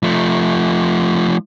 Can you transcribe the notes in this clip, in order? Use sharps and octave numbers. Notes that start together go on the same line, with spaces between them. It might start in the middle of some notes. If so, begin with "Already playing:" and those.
F3 A3